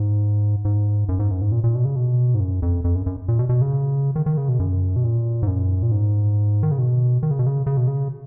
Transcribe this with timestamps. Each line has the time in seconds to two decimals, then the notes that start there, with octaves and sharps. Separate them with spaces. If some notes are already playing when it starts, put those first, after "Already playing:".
Already playing: G#2
0.65 G#2
1.09 F#2
1.19 G#2
1.31 F#2
1.41 G#2
1.52 A#2
1.64 A#2
1.75 B2
1.85 C#3
1.96 B2
2.34 G#2
2.40 F#2
2.62 F2
2.84 F2
2.95 F#2
3.06 F#2
3.28 A#2
3.39 B2
3.49 B2
3.61 C#3
4.16 D#3
4.26 D#3
4.37 C#3
4.49 B2
4.59 F#2
4.96 B2
5.04 A#2
5.43 G#2
5.48 F#2
5.83 A#2
5.92 G#2
6.63 D#3
6.71 C#3
6.79 B2
7.23 D#3
7.31 C#3
7.39 B2
7.46 C#3
7.67 C#3
7.77 B2
7.88 C#3